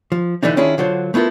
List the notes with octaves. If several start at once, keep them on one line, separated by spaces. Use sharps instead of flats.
F3
D3 E3 A3 D4 D#4
D#3 C#4 D4 E4 F4 G#4
D3 F#3 F4 C5
A3 B3 E4 F4 A#4